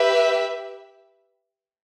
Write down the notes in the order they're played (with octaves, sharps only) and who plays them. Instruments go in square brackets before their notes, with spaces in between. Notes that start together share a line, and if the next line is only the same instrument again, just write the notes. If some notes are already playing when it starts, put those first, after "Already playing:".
Already playing: [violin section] G4 B4 E5